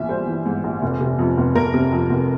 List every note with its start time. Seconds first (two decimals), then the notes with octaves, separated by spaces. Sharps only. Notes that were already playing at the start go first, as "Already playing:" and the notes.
Already playing: A#1 E3 E5
0.09 G3 C5
0.27 E3
0.46 G#2
0.64 A#1
0.82 F1
1.01 C3
1.19 F2
1.37 F1
1.55 F1 A#4
1.74 C3
1.92 F2
2.10 F1